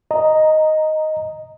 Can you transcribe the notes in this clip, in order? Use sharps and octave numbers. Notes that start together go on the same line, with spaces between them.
D#5 A#5